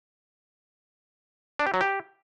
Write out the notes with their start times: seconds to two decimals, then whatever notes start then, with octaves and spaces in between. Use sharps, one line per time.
1.59 D4
1.67 G4
1.74 F#3
1.81 G4